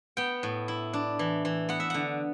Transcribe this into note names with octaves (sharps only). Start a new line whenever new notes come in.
B3 G5
A2
E4
D4
E3
E3
B3 F#5
E5
D3 F#5